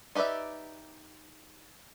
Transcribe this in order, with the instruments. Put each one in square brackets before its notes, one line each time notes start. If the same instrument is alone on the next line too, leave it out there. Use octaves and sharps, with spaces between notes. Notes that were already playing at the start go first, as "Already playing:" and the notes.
[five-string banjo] D#4 G4 B4 D5 E5